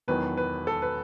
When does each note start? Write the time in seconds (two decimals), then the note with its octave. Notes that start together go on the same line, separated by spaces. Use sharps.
0.08 E1 E2 D#3 F#3 B3 B4
0.37 B4
0.67 A4
0.82 B4